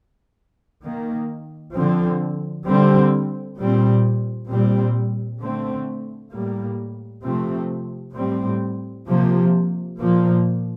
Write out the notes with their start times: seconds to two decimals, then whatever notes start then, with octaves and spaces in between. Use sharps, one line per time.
0.83 D#3 A#3
1.75 D3 F3 C4
2.66 D3 G3 C4
3.58 A#2 G3 C4
4.50 A#2 G3 C4
5.42 D3 A3 C4
6.33 A2 G3 A#3
7.25 C3 F3 A3 C4
8.16 A2 G3 C4
9.08 C3 F3 A#3
9.99 A#2 F3 A#3